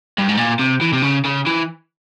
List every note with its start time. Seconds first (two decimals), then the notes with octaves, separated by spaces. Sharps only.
0.18 G2
0.29 G#2
0.37 A#2
0.59 C3
0.81 E3
0.93 C3
1.02 C#3
1.25 C#3
1.46 E3